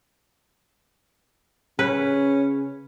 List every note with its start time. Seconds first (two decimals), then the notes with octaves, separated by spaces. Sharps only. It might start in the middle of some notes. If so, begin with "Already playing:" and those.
1.79 C#3 C#4 B4